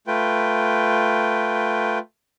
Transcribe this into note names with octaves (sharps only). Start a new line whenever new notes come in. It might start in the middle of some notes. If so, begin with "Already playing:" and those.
A3 F4 B4 G5